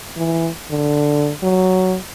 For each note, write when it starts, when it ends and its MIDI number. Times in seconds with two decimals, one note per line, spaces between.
0.17 0.49 52
0.71 1.32 50
1.43 1.97 54